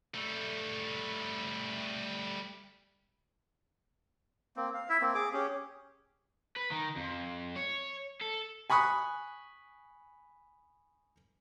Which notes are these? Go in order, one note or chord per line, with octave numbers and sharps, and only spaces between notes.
G3 A3
A#3 C4
F5
E4 E5
A#3 C4
G#4 D6
C#4 G4 G#4
B4
D#3
F2
C#5
A4
G#5 B5 C#6 D#6 F#6